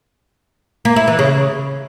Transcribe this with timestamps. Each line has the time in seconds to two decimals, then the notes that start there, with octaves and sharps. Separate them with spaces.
0.85 A#3
0.96 E4
1.08 E3
1.19 C#3